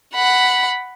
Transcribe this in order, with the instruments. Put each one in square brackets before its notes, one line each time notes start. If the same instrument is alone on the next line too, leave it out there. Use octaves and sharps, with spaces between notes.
[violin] F#5 B5